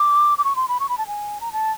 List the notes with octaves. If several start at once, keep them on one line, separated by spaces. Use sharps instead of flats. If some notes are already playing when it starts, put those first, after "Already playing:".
Already playing: D6
D6
C#6
C6
B5
C#6
B5
A5
G#5
A#5
A5